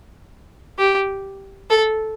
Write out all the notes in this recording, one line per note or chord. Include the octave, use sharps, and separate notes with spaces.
G4
A4